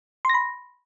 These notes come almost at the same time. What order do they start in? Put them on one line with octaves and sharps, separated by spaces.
C6 A#6 B5